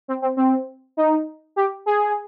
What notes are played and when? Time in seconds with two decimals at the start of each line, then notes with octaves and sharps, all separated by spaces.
0.08 C4
0.22 C4
0.37 C4
0.97 D#4
1.56 G4
1.86 G#4